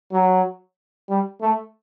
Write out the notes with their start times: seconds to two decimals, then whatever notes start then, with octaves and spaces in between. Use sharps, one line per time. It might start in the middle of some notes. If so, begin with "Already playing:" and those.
0.12 F#3
1.09 G3
1.41 A3